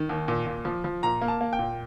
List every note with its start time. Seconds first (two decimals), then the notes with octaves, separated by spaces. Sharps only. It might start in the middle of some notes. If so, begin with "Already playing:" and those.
Already playing: D#3
0.09 D#2
0.28 A#2
0.46 A#2
0.65 F3
0.84 F3
1.03 A#2 A#5
1.21 A#3
1.28 A5
1.41 A#3
1.53 G5
1.59 A#2